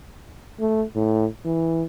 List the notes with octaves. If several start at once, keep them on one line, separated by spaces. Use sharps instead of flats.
A3
A2
E3